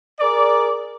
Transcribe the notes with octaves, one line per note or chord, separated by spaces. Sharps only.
G#4 A#4 D5